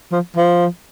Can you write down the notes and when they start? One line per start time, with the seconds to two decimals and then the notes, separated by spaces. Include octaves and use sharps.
0.12 F3
0.37 F3